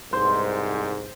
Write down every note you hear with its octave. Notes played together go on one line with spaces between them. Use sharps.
C2 G#2 C5